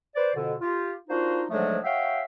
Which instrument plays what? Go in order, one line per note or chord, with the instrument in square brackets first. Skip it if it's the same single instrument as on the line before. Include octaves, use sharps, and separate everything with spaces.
[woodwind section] B4 C5 D5
F2 B2 D3
F4 G4
A#3 D4 D#4 F4 F#4 C5
G#2 D3 F3 F#3 G#3 A3
F#4 C#5 E5 F5 G5